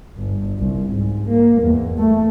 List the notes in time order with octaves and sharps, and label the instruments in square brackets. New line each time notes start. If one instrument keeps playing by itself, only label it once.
[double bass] G1
C2
G#2
A#3
E2
A3